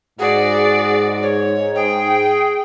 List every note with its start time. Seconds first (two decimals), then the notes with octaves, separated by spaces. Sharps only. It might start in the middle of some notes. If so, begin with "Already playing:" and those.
0.19 G#2 F#4 G#4 D5
1.22 C#5
1.76 G#4 G5